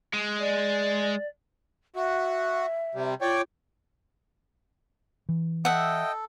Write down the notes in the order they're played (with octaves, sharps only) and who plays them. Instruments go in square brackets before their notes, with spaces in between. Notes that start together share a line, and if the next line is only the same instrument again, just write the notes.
[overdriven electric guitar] G#3
[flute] D5
[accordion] F#4 [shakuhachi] E5
[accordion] C3 G3
[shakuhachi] F4 [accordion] C#5 D5 G5
[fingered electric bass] E3
[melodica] A4 [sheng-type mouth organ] D#5 G5 [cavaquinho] E5 F#5